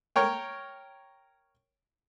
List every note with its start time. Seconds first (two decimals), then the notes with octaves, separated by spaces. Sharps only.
0.16 A#4 C#5 G5